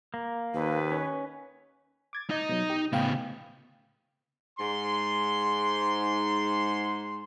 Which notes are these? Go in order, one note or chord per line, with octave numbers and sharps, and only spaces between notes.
A#3
D#2 B4
C#4
D6 G#6 A6
D#4 D#5
B2 F#3
G4
A2 C#3 B3 F5 G5
G#2 C6